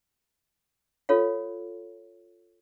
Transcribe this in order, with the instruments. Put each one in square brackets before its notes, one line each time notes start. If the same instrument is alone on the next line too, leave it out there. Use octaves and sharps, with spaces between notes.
[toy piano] F4 A4 C#5 F5